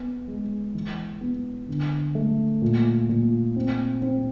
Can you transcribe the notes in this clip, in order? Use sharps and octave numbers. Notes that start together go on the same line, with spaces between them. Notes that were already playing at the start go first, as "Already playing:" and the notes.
Already playing: B3
G#3
E3
B3
D3
A3
A#2
A#2
C4
C4